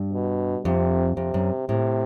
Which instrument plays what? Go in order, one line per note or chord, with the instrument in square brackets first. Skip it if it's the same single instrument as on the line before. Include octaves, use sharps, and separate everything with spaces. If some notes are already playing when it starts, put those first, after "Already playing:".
Already playing: [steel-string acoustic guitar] G2
[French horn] B2
[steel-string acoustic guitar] F2 [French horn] C3
[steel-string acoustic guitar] F2 [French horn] C3
[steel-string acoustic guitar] F#2
[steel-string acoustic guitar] A2 [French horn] C3